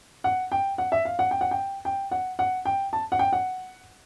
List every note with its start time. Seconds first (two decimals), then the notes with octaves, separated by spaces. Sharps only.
0.24 F#5
0.52 G5
0.78 F#5
0.92 E5
1.05 F5
1.19 F#5
1.31 G5
1.41 F#5
1.51 G5
1.85 G5
2.11 F#5
2.39 F#5
2.65 G5
2.93 A5
3.12 F#5
3.19 G5
3.33 F#5